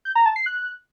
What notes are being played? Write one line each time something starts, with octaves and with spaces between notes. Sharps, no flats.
G6
A#5
A5
C7
F#6